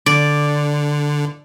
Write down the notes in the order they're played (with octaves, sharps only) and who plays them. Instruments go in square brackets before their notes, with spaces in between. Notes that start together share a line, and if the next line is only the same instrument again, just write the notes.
[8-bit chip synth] D3 [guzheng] D5